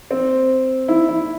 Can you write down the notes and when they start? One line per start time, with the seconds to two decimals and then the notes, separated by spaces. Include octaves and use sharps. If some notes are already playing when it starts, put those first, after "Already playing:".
0.11 C4
0.88 E4
1.09 E4